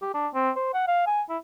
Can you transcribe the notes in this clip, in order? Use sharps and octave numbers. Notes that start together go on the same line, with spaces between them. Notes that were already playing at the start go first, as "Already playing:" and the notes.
G4
D4
C4
C5
F#5
F5
G#5
E4